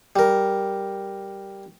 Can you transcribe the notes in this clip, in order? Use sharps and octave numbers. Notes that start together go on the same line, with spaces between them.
G3 A#4